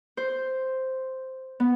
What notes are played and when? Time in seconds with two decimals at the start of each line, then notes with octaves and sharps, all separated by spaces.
0.17 C5
1.60 B3